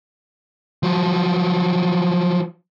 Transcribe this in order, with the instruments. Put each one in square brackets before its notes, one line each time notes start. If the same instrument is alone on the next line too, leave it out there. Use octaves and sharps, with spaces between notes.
[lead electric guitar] F3 F#3